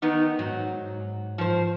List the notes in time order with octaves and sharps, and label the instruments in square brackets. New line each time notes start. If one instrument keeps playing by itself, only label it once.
[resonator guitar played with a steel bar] D#3 B3 D#4
[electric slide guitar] G#2 [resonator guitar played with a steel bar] F#3
[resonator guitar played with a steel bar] F3 C5